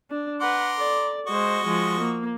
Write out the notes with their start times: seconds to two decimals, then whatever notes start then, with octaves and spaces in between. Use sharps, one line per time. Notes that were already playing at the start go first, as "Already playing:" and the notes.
0.11 D4
0.41 B4 F#5 A#5 C6 D6
0.76 A4 D5
1.27 G#3 F#4 C5 D#5 C#6
1.64 F3 G#3
2.00 A#3